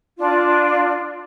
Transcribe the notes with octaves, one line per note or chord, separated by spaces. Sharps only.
D4 F4